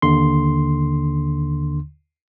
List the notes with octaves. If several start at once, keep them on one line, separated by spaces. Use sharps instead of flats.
D#2 D3 C6